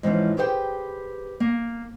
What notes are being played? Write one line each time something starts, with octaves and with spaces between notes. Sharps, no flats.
G#2 E3 F3 C#4
G4 G#4 B4 C5 F5 G5
A#3